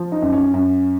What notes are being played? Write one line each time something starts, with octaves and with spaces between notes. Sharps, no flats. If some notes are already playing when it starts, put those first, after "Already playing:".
Already playing: F3
D#4
F#2
C#4
F#2